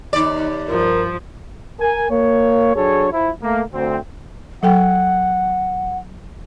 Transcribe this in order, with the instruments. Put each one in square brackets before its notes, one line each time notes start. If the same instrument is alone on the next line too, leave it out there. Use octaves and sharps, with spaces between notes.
[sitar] D#2 D5 [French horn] D#4
[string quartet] G2 F3 [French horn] A#4
[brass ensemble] A#4 G#5
A#3 C#5
F#3 D4 G#4 A4 C#5
F3 E4
A3 A#3
D2 C4
[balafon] F#3 A4 G5 [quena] F#5